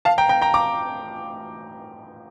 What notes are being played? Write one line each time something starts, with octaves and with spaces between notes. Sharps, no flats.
F5 A5
G5 A#5
G5 A#5
G5 A#5
A#5 D6